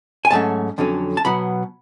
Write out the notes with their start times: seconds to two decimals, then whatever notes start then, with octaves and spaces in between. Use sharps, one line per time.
0.25 G#5
0.31 G#2 F#3 A3 C#4 A5
0.78 F2 D3 F#3 C#4
1.17 A5
1.25 B2 F#3 B3 B5